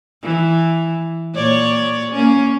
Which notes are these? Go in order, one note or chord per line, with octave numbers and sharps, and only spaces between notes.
E3
A#2 C#5 D5
A#3 C#4